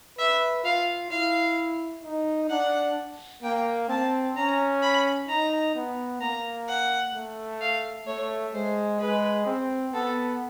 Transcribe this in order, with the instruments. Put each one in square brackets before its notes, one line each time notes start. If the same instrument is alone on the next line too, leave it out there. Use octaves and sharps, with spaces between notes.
[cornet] B4 [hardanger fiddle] E5
[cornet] F4 [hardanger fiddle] F5
[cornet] E4 [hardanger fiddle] F5
[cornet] D#4
[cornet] D4 [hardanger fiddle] F#5
[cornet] A#3 [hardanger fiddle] G5
[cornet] C4 [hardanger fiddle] A5
[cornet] C#4 [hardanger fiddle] A#5
[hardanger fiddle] B5
[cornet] D#4 [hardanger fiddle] A#5
[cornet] B3
[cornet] A#3 [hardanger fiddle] A#5
[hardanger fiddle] F#5
[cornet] A3
[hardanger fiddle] F5
[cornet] A3 [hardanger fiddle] C#5
[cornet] G#3 [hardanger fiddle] C5
[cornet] G#3 [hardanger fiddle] B4
[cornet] C4
[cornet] B3 [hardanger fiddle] A4